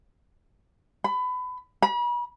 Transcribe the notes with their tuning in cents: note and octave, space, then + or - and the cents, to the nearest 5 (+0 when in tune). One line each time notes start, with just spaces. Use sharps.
B5 +25
B5 -40